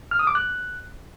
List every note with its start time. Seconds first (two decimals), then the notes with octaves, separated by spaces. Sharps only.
0.11 F6
0.19 D#6
0.27 D6
0.35 F#6